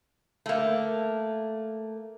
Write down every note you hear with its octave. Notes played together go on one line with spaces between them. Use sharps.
A3 A#3